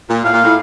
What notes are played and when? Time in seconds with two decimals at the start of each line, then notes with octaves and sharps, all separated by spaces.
0.09 A#2
0.24 A2 F5
0.34 A#2
0.44 A2